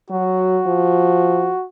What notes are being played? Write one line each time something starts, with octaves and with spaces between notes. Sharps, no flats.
F#3 F#4
F3